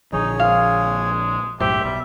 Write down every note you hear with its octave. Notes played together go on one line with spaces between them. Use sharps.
A#1 D3 F3 D#4 G#4 C#5
G#3 F5
B1 F#2 A2 G4 C5 E5
B1 G3